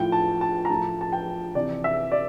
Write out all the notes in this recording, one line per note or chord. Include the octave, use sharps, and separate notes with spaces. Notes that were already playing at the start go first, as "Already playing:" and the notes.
Already playing: A2 F3 G5
A5
A5
A#5
A2 F3 A5
A5
G5
C3 E3 D5
E5
D5